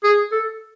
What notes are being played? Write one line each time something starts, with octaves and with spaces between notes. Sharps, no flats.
G#4
A4